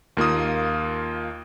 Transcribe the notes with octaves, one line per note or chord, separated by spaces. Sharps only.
D#2 A#3 F4 D#6